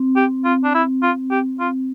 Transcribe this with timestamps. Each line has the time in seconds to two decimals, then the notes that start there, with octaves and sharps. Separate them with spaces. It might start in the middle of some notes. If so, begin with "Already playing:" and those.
Already playing: C4
0.16 G4
0.45 F4
0.64 D4
0.74 E4
1.02 F4
1.31 G4
1.60 F4